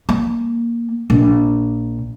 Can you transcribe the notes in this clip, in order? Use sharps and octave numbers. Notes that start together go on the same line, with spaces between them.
A#3
A#1